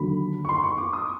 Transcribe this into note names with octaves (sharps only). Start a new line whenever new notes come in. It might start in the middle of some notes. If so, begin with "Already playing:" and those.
Already playing: D#2 D3 F#3 B5
C#6
C6
C#6
D6
D#6